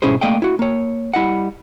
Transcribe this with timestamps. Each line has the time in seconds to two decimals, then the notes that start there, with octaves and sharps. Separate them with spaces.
0.02 G#2 B2 C#4 E4 G#4 C5
0.21 A3 A#3 D5 D#5 F5 G5
0.42 E4 F#4
0.59 A#3 C#5
1.14 G3 E4 D#5 F#5